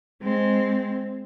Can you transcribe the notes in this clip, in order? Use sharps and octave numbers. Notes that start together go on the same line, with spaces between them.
G#3 C4